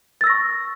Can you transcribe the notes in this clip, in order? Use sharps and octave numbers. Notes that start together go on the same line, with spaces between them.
C#6 E6 A6 A#6